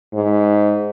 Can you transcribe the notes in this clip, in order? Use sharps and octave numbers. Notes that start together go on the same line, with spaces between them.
G#2